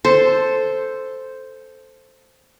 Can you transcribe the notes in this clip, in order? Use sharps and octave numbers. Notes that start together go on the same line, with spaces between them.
A4 C5